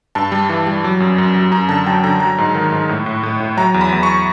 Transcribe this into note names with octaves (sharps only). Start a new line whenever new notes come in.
G2 A5
G3
E3
G3
F#3
F#2
F#2
F#3
F#2 A#5
D3 A5
F#3 G5
D3 A#5
F#3 A#5
G#2
D#3
G#2
A2
A2
A2
A2
F#3 A#5
E2
B5
E2
C#6